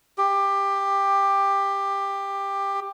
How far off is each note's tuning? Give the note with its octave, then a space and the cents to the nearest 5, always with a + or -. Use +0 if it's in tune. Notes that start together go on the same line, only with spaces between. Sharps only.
G4 +15